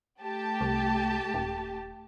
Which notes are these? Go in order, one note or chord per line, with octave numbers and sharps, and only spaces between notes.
A3 G4 A5
C2
D#1